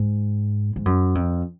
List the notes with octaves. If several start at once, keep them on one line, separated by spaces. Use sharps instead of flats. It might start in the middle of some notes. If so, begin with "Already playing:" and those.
Already playing: G#2
G#2
F#2
F2